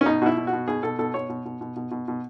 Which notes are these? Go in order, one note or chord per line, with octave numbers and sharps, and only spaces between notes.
C#4
B2 D#4
B2 E4 F#4
B2
F#4
B2
B2 G#4
B2 A4
B2 A4
B2 C#5
B2
B2
B2
B2
B2
B2